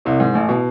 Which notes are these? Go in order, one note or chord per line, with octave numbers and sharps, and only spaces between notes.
C2 C3
G#2
A1 A2
B2